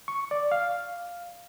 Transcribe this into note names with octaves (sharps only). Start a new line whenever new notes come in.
C#6
D5
F5